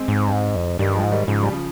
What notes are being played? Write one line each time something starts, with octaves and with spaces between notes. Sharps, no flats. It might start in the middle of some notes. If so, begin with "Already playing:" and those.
Already playing: G#3 C4
G#2
G2
G#2
F2
G2 D#3 G3
F3 G#3
G#2
D#3 G3
G#2 C#3 F3
G3
C#3 F3